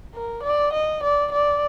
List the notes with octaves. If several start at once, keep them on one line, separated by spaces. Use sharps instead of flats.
A#4
D5
D#5
D5
D5